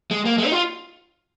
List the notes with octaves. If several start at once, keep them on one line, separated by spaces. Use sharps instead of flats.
G#3
A#3
G#3
D#4
F4